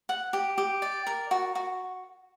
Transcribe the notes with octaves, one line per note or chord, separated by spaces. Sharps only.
F#5
G4
G4
D5
A#4
F#4
F#4